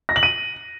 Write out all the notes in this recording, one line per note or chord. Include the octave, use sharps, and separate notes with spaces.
A#6
F#7
D#7